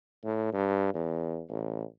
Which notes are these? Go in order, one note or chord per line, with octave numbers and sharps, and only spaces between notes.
A2
G2
E2
A1